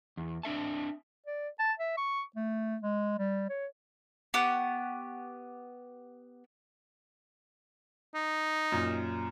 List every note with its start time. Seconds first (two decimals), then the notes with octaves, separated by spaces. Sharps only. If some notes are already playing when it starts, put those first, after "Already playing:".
0.17 E2
0.43 C4 D4 E5 A5
1.26 D5
1.59 A5
1.79 E5
1.97 C#6
2.36 A3
2.82 G#3
3.18 G3
3.49 C#5
4.34 B3 G4 F#5 C#6
8.15 D#4
8.72 F#2 A#2